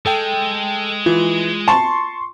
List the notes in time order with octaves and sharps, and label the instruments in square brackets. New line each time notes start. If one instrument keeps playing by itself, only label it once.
[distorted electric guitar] G#3 [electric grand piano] A4 G5
[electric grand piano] E3 [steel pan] F4
[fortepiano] A5 [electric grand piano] C6 C#6